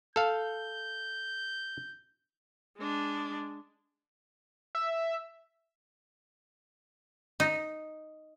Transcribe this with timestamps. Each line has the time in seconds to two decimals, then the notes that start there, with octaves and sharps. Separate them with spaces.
0.16 A4 F5 G6
2.78 G#3 D4
4.75 E5
7.40 D#4